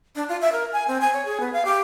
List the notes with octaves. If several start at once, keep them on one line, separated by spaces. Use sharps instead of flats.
D4
F4
E5
A#4
G#5
C4
G#5
C#5
G#4
B3
F5
G4